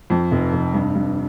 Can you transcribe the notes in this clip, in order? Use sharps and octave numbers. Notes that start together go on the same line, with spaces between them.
F2
F1
F1
G2
G2